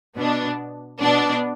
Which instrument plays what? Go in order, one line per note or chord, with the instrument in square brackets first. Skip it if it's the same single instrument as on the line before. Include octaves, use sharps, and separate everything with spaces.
[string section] B2 B3 D4
B2 B3 D4